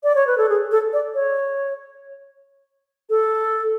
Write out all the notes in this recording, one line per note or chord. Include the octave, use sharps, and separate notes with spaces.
D5
C#5
B4
A4
G#4
A4
D5
C#5
A4